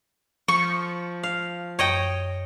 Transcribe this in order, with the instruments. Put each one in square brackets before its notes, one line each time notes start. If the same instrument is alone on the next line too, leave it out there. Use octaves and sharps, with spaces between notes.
[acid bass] F3 [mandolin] C#6
[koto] F5
[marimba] F#2 [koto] C#5 D#5 G5